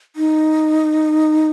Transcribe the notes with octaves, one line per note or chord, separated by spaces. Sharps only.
D#4